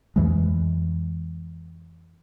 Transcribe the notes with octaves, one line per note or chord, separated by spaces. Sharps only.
F2 E3 G#3